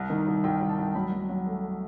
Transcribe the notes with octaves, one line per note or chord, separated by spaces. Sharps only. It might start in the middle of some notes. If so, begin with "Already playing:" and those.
Already playing: C2
D#3
C2
C2 G5
C2
A5
C2
F#3 B5
F#3
F#3
A3